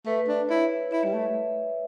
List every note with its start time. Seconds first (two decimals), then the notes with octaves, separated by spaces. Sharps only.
0.06 A3 B4
0.28 D4
0.49 E4 C#5
0.92 E4 E5
1.05 G3
1.14 A3